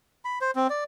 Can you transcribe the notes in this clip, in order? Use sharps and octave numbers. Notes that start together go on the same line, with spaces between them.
B5
C5
C4
D5